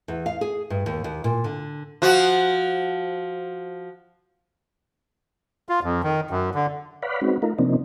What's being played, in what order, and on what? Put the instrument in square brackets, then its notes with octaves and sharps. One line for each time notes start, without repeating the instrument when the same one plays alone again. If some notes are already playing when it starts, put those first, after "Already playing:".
[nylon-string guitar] E2
F5
G#4
G2
D#2
D#2
A#2
D3
[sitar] F3 F#4
[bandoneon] F4
F2
D#3
F#2
D3
[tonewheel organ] B4 C#5 D5 F5 F#5 B5
G#3 C4 C#4 D#4 F#4 B4
A3 D#4 F4 A#4
C3 F3 A#3 C4 D4 D#4